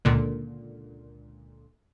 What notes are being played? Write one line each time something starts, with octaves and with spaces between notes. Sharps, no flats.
C#2 A#2 D3